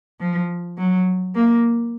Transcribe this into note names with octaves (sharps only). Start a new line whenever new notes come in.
F3
F#3
A#3